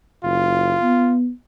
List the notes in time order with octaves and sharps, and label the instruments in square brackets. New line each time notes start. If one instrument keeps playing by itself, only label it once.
[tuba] F#1 [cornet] F4
[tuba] B3